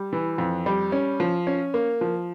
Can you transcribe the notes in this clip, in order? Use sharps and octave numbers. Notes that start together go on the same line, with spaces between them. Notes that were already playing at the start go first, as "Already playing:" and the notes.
Already playing: G3
E3
F2
G3
C#4
F3
C#4
A#3
F3